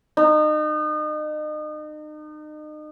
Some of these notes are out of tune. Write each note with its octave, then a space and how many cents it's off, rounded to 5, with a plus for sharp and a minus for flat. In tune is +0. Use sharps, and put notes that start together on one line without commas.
D#4 -35